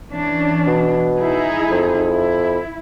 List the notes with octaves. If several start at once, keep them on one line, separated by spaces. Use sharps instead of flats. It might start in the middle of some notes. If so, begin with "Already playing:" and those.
E3 C#4 D4
B2
D#4 E4 G#4
F2
E4